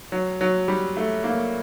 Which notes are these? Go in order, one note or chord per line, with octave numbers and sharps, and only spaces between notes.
F#3
F#3
G3
A3
A#3